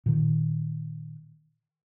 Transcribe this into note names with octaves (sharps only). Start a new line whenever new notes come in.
A#2 D#3